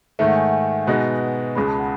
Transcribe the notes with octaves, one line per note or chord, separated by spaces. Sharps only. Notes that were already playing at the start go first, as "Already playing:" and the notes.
G#2 D#3 A3 E5
F#5
G#5
F#5
G#5
B2 G#3 B3 D#4 F#4
C#2 C#3 G#3 B5
A5
F#5